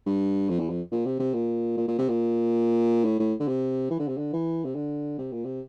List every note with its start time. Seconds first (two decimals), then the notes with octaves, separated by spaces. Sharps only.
0.06 G2
0.49 F2
0.59 E2
0.70 F2
0.92 A#2
1.06 C3
1.19 C3
1.34 A#2
1.77 A#2
1.88 A#2
1.99 C3
2.09 A#2
3.04 A2
3.19 A2
3.40 D3
3.48 C3
3.90 E3
3.99 D3
4.08 C3
4.17 D3
4.33 E3
4.64 C3
4.75 D3
5.18 C3
5.32 A#2
5.45 C3